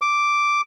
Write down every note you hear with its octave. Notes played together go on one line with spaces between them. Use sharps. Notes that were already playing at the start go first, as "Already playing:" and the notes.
D6